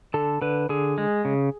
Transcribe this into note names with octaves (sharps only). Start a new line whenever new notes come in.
D3 A4
D3 B4
D3 G#4
G#3
C#3